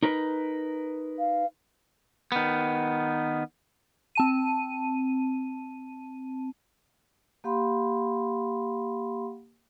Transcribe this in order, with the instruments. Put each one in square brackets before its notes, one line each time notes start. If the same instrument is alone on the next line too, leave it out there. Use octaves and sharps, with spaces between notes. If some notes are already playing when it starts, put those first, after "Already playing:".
[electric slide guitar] D#4 A#4 B4
[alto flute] F5
[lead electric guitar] D#3 B3
[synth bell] C4 A5 D#7
[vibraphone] A#3 G4 F5 F#5 B5 C6